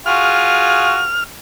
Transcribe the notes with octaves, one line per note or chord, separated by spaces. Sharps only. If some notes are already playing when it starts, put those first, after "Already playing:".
F4 F#4 G#4 F6